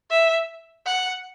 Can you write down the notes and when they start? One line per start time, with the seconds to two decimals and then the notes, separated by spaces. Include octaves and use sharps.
0.10 E5
0.86 F#5